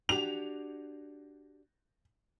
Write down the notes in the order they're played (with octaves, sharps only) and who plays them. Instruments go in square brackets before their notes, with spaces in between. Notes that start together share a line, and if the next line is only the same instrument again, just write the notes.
[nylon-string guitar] D4 F#4 G4 [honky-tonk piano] F7